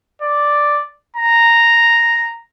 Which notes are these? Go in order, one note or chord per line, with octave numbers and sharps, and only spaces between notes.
D5
A#5